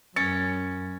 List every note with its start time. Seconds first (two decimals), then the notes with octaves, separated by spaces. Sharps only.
0.16 F#2 C#4 A6 C#7